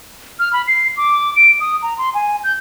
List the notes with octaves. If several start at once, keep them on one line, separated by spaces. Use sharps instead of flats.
F6
B5
C7
D6
D7
D#6
A#5
C6
G#5
G6